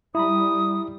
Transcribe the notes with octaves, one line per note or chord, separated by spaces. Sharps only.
G3 E4 A#5 B5 D#6